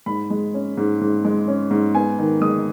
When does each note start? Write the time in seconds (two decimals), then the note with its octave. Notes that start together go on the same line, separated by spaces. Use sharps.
0.06 G#2 B5
0.30 G#3
0.54 C#4
0.77 G#2
1.01 G#2
1.24 G#3
1.48 C#4
1.71 G#2
1.94 B3 G#5
2.18 D#3
2.41 G#3 D#6